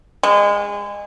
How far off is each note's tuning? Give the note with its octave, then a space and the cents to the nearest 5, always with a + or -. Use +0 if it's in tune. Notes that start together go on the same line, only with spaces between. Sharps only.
G#3 -25